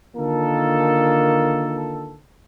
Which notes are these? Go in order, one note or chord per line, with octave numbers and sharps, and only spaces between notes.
D3 D#3 A#3 F4 A4